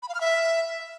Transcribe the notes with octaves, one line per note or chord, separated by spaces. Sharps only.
B5
F5
F6
E5